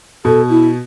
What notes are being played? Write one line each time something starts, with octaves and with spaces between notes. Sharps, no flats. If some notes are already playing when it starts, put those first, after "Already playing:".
B2 A4
E4